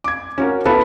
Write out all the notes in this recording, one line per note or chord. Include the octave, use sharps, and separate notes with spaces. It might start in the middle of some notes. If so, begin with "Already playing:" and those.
D6 G#6
C#4 F#4 A#4
B3 E4 A4 B4 F5 A5